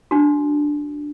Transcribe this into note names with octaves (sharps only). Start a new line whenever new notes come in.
D4 F#4